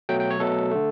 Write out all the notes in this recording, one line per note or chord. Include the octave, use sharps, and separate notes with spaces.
B2 F#3 A3 G5
G5
C#5
B2 F#3 A3 A4
D3 A3